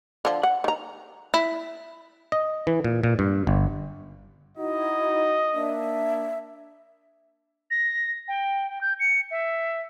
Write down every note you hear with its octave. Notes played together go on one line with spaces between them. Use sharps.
D3 F3
F#5
D#3 A#5
E4
D#5
E3
A#2
A#2
G2
G1
D#4 E4 F#4 D#5
A#3 D4 E5
A#6
G5
G6
C#7
E5